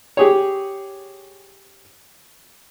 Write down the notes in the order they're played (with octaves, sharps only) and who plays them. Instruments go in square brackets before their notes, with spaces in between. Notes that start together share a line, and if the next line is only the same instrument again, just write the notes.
[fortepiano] G4 G#4 C#5